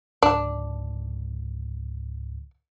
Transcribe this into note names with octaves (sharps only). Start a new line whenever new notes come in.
C#2 G#2 D3 D4